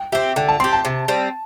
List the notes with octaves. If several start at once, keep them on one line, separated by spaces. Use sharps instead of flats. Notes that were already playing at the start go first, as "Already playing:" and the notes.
Already playing: G5
C4 G4 E5
D3 G5
A5
C4 G4 C6
A5
C3
G3 C4